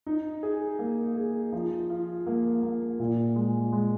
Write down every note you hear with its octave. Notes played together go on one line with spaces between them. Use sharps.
D#4
G#4
A#3
G#4
F3
F4
A#3
A#3
A#2
G#3
G#3